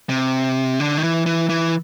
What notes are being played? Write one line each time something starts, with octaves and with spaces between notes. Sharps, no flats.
C3
D3
D#3
E3
E3
E3